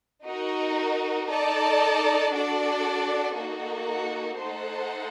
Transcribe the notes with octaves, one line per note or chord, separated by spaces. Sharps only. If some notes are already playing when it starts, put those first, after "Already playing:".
D#4 F#4 A#4
D#4 A4 D5 A5
D4 F#4 A4 D5
A#3 D#4 F#4 A4
A3 D#4 A4 C5 F#5